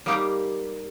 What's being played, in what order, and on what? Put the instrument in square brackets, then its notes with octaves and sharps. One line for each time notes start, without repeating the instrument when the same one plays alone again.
[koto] G3 A#3 D#4 G4